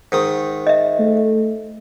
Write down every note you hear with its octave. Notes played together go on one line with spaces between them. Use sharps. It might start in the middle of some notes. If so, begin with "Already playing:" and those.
G#2 D#3 D#6
D#5 E5
A3